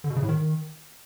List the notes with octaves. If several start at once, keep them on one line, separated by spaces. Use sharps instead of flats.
D3
B2
C#3
A2
D#3